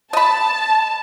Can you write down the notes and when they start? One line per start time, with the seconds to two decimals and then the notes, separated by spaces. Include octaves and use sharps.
0.13 D#5 A5 B5